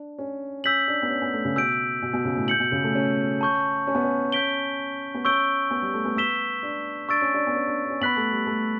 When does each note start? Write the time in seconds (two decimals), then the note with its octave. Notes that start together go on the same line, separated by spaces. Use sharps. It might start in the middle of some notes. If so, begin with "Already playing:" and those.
Already playing: D4
0.19 C#4
0.64 C#4 E6 G6 B6 F#7
0.88 D4
1.02 B3
1.10 C#4
1.22 B3
1.33 A3
1.45 C#3
1.56 B2 E6 G6 D7
2.02 B2
2.13 B2
2.25 C#3
2.36 A2
2.48 G6 C#7 F#7
2.60 B2
2.72 C#3
2.84 A3
2.95 C#4
3.41 A5 C#6 G6
3.87 C#4
3.95 B3
4.03 C#4
4.32 G6 B6 D7 G7
5.14 B3
5.25 C#4 C#6 E6 G6 D7 G7
5.71 B3
5.82 G3
5.94 A3
6.05 B3
6.17 B3 E6 B6 E7 G7
6.63 D4
7.09 D4 C#6 E6 A6 D7
7.21 C#4
7.34 D4
7.47 B3
7.56 C#4
7.67 D4
7.85 D4
7.90 C#4
8.01 B3 B5 F#6 B6 F#7
8.16 A3
8.31 G3
8.47 A3